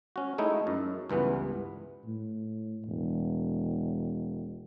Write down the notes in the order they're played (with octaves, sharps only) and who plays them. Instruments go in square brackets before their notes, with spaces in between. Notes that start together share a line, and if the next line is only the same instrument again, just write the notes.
[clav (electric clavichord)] C#4 F#4
G#3 A3 D#4 E4
F#2
C#2 G2 E3 B3 F#5
[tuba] A2
E1